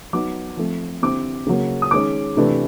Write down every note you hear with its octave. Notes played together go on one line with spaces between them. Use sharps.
F#3 B3 D#4 D6
F3 A3 C4
D3 G3 C4 E4 D6
C#3 F#3 A#3
D#6
D#3 G#3 C#4 D6
C3 E3 A3 D4